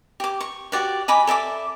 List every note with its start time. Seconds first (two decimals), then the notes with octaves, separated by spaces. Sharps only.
0.20 G4 D6
0.41 C#6
0.72 F#4 G4 D5 F#5
1.08 D#5 G#5 B5 D6
1.27 A4 D5 E5 D6